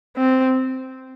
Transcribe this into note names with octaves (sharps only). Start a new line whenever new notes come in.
C4